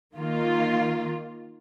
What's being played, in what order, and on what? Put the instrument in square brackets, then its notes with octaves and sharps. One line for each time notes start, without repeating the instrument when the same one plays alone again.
[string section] D#3 A#3 F4